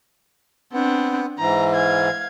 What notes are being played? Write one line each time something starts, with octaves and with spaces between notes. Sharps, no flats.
B3 C4 D4
G#2 E3 A#5
F5 G#6